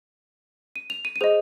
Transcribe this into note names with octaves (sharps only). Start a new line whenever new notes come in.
D#7
F7
D#7
D#7
G#4 C5 D#5 F7